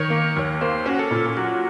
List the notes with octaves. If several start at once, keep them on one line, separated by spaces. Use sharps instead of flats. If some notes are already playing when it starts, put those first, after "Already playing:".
Already playing: D#3 C#5
A#3
D#2
A#3 C5
C#4 F#4
A4
A#2
F#3 F#4